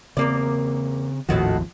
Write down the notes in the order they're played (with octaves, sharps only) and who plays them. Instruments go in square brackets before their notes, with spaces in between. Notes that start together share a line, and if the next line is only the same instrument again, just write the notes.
[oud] E2 A#3 D5 [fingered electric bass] C#3 C4
[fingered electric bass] G#1 D#2 F3 [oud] A2 D#3 F#4